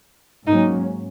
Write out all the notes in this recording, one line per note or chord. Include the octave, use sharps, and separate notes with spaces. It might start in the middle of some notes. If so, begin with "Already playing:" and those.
G#2 F#3 A#3 C#4 D#4